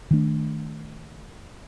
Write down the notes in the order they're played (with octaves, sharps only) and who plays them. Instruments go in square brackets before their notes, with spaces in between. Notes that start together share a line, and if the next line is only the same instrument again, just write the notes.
[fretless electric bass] D#3 A3 D4